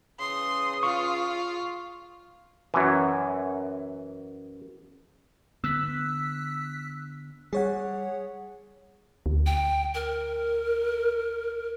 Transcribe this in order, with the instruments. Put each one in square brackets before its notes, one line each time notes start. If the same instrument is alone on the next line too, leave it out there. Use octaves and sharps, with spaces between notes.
[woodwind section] E2 C#3 D#6 [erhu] C6
[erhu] F4 [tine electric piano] C#6
[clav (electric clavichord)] F#2 E3
[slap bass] D3 B3 [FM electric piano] E6 F#6 B6
[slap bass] G3 [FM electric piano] G#4 C#5 F#5
[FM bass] D2
[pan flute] G5
A#4